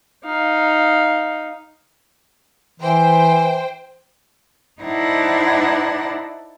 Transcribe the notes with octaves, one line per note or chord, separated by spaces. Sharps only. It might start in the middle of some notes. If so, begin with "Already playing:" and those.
D#4 F5
E3 C5 G5
D#4 E4 C5 D5 F#5 A5